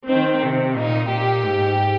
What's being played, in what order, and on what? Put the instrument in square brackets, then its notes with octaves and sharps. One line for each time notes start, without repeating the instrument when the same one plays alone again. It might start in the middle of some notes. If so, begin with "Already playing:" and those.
[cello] D#3 [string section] C4
[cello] C3
[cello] A#2 [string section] D#4
[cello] A#2 [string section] G4
[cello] G#2